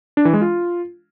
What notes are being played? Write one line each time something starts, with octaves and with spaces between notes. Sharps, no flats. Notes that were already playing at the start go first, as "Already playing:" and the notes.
D4
E3
G#3
F4